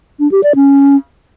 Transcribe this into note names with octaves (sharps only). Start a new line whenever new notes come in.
D4
G4
D5
C#4